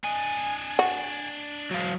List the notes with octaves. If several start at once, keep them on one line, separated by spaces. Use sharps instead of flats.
D4 D#5 G#5
F#4
E2 G#2 F#3 F5